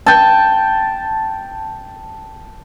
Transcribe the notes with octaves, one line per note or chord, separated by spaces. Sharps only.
G5 A5